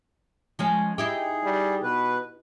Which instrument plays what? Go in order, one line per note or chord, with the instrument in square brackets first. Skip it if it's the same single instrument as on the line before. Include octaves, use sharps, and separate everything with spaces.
[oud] F3 G#3 C#4
[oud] D#4 E4 G4 [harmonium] G#4
[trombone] G3
[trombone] B2 [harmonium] B4